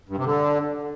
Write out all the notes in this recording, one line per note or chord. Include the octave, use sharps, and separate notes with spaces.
G2
C3
D3